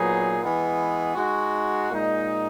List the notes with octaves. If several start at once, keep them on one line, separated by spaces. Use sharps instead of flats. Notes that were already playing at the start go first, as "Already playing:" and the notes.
Already playing: A#2 F#3 B3 D#4 G#4
E3 G#3 B3
G#3 D#4 F#4
A#2 G#3 D#4